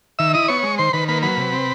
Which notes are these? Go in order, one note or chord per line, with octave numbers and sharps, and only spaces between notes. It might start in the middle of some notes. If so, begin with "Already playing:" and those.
D#3 E5 E6
E4 D#5 D#6
B3 C#5 C#6
G#3
D#3 C5 C6
D#3 B4 B5
A#3 B4 B5
F#3 B4 B5
C3
C4